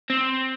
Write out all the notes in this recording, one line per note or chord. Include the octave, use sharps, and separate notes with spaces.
C4